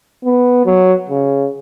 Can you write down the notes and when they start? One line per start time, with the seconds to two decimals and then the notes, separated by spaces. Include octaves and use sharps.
0.24 B3
0.66 F#3
1.10 C#3